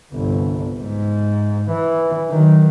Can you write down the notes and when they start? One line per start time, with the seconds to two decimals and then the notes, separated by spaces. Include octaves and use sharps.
0.13 G1 C2
0.79 G#2
1.70 E3
2.30 D#3 F#3